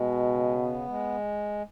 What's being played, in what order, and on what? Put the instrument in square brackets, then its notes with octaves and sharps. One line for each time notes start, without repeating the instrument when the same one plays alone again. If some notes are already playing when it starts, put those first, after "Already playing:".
Already playing: [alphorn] B2 [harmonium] G#3
[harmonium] C#3
B3
G#3